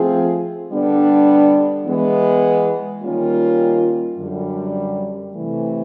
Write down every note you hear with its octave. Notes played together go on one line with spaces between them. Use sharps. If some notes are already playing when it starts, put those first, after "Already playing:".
Already playing: F3 A3 C4 F4 G#4
D3 G3 B3 D4
E3 G#3 B3
D#3 G3 A#3 C#4 F4
F#2 D3 G3
C3 E3 A3